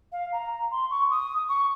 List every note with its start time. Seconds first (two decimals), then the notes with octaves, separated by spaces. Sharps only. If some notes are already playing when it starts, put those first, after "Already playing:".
0.12 F5
0.32 A#5
0.72 C6
0.91 C#6
1.11 D#6
1.49 C#6